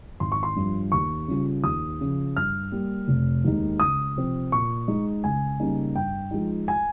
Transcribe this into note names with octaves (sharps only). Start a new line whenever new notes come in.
G#1 C6
C#6
C6
G2 F3
D#2 C#6
C#3 G3 C#4 F4
D#2 D#6
C#3 F3
G2 F6
G3 A#3
F1
D#2 D#3 G#3 D#4
C#2 D#6
C3 F3 C4
A#2 C#6
G#3 D#4
C#2 G#5
C#3 G3 A#3 D#4
G2 G5
F3 G#3 D#4
G#5